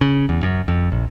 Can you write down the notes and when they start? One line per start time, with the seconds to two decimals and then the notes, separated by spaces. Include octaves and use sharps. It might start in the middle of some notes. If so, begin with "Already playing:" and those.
0.01 C#3
0.29 E2
0.43 F#2
0.68 F2
0.92 A#1